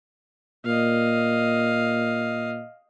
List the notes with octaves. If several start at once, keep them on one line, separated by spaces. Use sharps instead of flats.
A#2 D#5 F5